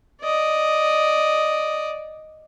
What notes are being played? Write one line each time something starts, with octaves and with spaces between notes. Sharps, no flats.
D5 D#5